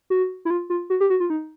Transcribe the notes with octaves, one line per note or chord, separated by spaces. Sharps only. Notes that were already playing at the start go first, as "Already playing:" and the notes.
F#4
E4
F4
F4
F#4
G4
F#4
F4
D#4